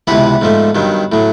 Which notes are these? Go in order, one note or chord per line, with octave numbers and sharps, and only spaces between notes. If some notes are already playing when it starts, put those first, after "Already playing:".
C#2 C3 E3 B3 B4
G#2 F3 A3
G2 D#3 F#3
A2 F#3